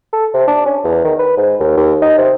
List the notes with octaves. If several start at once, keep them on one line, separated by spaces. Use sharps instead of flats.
A4
C3
D4
C#4
E2
D#3
B4
G#2
D#2
D#2
D#4
C3